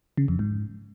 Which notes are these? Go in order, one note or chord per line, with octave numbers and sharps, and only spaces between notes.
C#3
F2
G#2